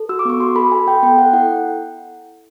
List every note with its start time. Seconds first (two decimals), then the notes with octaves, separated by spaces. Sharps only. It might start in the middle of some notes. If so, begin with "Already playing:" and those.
Already playing: A4
0.09 F#4 E6
0.19 D6
0.25 B3 C#6
0.40 F#4 C6
0.55 A4 B5
0.71 A4 G#5
0.87 A4 G5
1.03 B3 G5
1.18 A4 F#5
1.33 E4 F#5